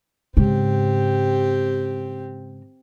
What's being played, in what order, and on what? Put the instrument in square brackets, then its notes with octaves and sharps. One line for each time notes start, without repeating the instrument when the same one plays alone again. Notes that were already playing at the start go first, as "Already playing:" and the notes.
[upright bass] G#2 C#3 [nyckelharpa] C4 G4